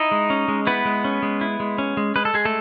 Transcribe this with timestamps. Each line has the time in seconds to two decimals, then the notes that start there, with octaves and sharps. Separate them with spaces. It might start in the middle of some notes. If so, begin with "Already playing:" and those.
Already playing: D#4 E4 D#5
0.11 G#3
0.30 C#4
0.48 G#3
0.67 B3 E4 B4
0.85 G#3
1.05 C#4
1.23 G#3
1.41 E4
1.60 G#3
1.78 C#4
1.97 G#3
2.16 G#3 B4
2.25 A4
2.34 G#3 G#4
2.45 A3 A4